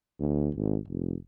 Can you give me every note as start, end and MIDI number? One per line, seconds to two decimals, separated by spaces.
0.20 0.50 38
0.55 0.77 32
0.88 1.15 29